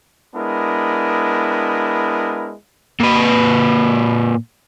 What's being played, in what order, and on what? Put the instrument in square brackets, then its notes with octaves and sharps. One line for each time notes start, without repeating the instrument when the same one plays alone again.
[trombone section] G#3 B3 D4 E4 A#4
[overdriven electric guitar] A#2 B4